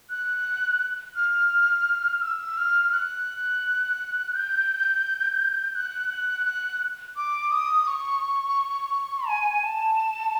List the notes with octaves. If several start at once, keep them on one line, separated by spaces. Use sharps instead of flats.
F#6
F6
E6
F6
F#6
G6
F#6
F#6
F#6
D6
D#6
C#6
G#5
A5